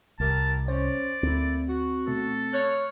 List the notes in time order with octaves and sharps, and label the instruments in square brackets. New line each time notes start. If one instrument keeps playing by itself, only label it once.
[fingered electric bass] C2 [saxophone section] E4 G4 A#4 [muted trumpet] A5
[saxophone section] C#4 [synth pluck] C5 [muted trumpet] D5
[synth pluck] D2 [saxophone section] A3 A#3 E4 [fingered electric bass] C4
[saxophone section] F#4
[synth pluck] B2 A3 [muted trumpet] A4
[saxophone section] C#5 [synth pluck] F6 F#6